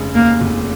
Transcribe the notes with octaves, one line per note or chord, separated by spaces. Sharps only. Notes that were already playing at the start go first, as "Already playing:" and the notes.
Already playing: F1 C#3 G#3
D#2 A#3
F1